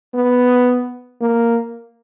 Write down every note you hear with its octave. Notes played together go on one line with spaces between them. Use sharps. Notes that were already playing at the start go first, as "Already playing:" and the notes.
B3
A#3